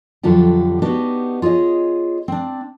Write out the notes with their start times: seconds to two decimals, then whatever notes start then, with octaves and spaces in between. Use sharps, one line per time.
0.23 F2 D3 F#3 F4 G4
0.82 B3 D4 D#4 F#4 G4
1.42 F4 G#4 C#5 D#5
2.28 C4 D4